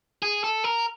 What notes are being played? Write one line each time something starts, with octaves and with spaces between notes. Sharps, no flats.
G#4
A4
A#4